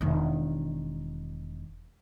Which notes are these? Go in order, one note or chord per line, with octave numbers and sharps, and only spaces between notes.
E1 D#3